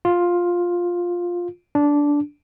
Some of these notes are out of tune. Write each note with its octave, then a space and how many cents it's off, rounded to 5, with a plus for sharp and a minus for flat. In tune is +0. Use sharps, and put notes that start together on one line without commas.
F4 +10
D4 -10